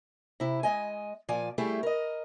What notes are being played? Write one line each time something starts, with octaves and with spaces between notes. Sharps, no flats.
C3 E4
G#3 D#5 G#5
A#2 F3 D5 G#5
G3 A3 E4 G4 G#4
A#4 D#5